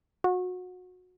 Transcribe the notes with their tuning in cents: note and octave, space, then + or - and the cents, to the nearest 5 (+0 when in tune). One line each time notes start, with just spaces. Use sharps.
F#4 -25